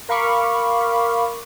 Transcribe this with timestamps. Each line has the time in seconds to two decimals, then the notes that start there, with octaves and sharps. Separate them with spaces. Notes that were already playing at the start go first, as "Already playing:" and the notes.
0.09 A#4 F5 B5 C#6 D6